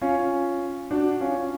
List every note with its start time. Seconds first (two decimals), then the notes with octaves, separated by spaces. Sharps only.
0.01 C#4 F4
0.90 D4 F#4
1.21 C#4 F4